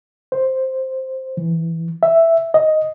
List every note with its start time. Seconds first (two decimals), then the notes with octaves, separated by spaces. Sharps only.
0.32 C5
1.37 E3
2.03 E5
2.54 D#5